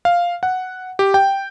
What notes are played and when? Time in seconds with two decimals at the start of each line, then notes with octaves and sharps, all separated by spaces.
0.05 F5
0.43 F#5
0.99 G4
1.14 G5